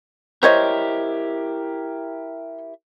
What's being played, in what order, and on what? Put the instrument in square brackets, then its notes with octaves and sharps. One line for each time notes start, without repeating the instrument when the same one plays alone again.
[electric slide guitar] E4 G4 A#4 [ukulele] C5 C#5 D#5